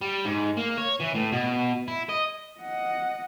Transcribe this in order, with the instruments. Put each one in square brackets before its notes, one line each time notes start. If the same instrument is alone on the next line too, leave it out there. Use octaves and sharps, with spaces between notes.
[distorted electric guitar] G3
G#2
A#3
C#5
E3
A2
B2
E4
D#5
[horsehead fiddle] D#5 F#5